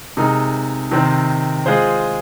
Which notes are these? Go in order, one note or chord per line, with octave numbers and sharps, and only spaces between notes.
C3 G#3 D#4 A#4
C3 D#3 C4
G#3 F4 G#4 C5